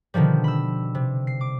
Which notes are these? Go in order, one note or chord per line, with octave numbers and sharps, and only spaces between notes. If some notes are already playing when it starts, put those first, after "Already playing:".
B2 D3 D#3 F3 G3
B5 E6
C3
C7
D6